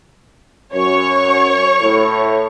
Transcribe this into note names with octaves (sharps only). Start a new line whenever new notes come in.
F#2 C#5 C#6
A2